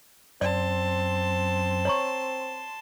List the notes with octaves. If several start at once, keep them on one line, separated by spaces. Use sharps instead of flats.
F#2 C4 D5 A5 C6
C#5 A#5 C#6